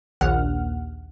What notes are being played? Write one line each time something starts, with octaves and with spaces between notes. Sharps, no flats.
A#1 D#2 F#5 F6